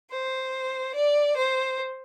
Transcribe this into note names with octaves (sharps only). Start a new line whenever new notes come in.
C5
D5
C5